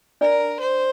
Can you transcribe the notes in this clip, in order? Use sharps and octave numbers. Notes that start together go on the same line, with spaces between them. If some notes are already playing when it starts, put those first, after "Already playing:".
D4 A#4 D5
C5